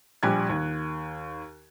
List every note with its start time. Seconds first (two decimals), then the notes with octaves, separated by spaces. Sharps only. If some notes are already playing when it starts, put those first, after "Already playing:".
0.23 A#1 G3 G4 G#5 F#6 G#6
0.50 D#2